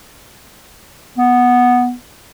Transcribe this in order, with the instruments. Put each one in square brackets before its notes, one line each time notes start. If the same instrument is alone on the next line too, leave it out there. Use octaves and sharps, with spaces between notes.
[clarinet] B3